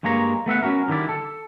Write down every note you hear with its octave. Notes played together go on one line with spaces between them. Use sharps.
G2 G#3 A#3 C#5 A#5
A3 B3 E5 F#5
C#4 F#4 G4 A#4 B4
D3 D#3 G3 E4 D5
A4